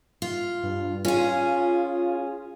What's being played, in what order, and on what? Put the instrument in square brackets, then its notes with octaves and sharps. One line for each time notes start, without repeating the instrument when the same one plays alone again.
[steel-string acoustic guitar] F4
[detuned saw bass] G2
[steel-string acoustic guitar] C#4 G#4 [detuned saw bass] F4